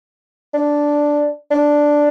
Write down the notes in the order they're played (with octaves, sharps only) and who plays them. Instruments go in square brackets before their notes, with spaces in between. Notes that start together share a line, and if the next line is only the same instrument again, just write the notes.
[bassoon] D4
D4